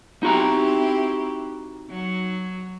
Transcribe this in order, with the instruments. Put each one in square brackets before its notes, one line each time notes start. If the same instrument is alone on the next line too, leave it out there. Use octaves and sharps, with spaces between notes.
[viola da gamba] C4 E4 G4 [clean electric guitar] D#4 F#4 A#5
[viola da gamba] F#3